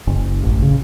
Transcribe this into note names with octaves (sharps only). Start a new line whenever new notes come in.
F#1
A1
C#3